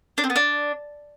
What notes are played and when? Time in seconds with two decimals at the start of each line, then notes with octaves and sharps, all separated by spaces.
0.18 D4
0.24 C4
0.30 B3
0.36 D4